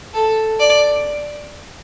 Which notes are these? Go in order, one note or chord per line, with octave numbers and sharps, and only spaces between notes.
A4
D5